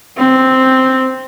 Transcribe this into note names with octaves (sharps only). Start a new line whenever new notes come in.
C4